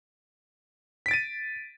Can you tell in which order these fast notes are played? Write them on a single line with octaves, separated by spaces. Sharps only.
B6 D7 A6 D#7